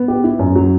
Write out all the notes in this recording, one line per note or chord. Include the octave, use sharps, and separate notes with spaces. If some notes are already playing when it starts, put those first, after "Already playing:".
Already playing: B3
G4
E4
F#2
F#3